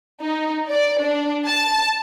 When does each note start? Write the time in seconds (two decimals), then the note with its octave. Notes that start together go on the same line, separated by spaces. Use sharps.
0.22 D#4
0.69 D5
1.02 D4
1.47 A5